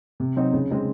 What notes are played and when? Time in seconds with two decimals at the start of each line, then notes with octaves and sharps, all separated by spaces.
0.20 C3
0.36 F#3 C4 D#4
0.53 C#3
0.70 G#3 C4 D#4